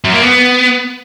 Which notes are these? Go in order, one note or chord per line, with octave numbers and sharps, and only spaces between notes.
F#2
A#3
B3